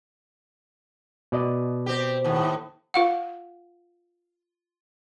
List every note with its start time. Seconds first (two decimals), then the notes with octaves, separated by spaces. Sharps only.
1.32 B2 D5 D#5
1.86 C4 G4
2.24 D#2 A2
2.94 F4 F5 F#5